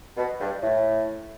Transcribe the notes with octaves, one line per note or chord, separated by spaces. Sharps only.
B2
G2
A2